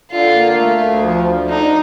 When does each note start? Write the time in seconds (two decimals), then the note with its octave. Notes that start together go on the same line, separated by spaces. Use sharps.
0.11 D3 F4
0.35 A#3
0.57 A3
0.81 D2
1.03 F3
1.27 D3
1.49 D4 D#4